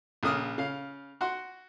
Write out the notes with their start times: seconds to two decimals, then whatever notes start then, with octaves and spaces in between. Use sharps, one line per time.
0.23 A#1 C#3 D#6 F6
0.58 C#3 F5
1.21 F#4 F#5 C6